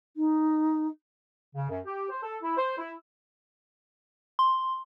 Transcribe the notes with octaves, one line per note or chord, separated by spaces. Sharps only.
D#4
C#3
F#2
G4
C5
A4
E4
C5
E4
C6